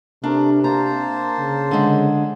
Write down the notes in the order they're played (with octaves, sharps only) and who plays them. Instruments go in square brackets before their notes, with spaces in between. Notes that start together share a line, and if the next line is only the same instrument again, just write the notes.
[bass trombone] C3 [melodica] A3 A#4 [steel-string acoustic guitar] D4
[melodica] A#3 C5 A5 [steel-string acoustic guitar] A#5
[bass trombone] C#3
[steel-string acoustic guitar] D3 G#3